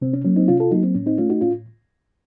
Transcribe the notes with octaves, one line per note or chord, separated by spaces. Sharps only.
C3 C4
C#4
F#3 A#3 C#4
C4 D#4
C3 C#4 F4
F4 A4
F#3 A#3 D#4 F#4
C4
A2 C#4
C4 D#4
A3 C#4 F4
D#4 F#4
A2 C#4 F4